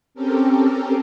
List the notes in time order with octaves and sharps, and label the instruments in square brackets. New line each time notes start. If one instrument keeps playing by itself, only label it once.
[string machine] C4 C#4 G4 A4 A#4